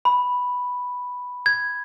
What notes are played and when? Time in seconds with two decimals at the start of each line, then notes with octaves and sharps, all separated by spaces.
0.05 B5
1.46 G#6